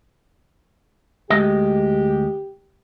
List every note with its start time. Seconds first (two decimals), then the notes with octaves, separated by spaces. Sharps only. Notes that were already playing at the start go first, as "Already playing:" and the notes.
1.30 D2 G#3 G4 D#5